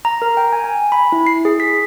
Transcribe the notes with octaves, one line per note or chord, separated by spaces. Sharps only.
A#5
A#4
G5
G#5
G#5
B5
E4
C7
G#4
B6